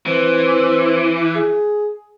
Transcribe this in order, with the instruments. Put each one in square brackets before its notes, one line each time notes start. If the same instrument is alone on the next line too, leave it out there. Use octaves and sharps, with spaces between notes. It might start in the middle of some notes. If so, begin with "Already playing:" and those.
[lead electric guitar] E3 [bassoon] C4
[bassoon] G#4